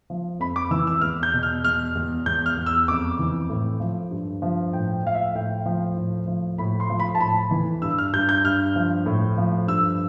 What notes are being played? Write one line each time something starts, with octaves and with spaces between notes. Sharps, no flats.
F3
F2 B5
D6
E3 E6
E6
E2 F6
G6
B2
F6
E2 F6
E2
E2 G6
F6
E2
E6
F2 D6
E3
A2
F3
G2
F3
A2 G5
F3 F5
E5
A2 G5
F3
A2
F3
A2 B5
C6
F3
B5
A5
A2 B5
E3
G2 E6
F6
G2 G6
G6
G2 F6
F3
A2
F3
G2 E6